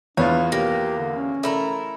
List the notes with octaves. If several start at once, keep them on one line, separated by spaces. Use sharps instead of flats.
E2 B3 D4 F4 C#5
A#3 G4
D3
C#4
A3 E4 A#4